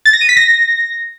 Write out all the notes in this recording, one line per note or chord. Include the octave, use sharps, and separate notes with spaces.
A6
A#6
D#7
B6
A#6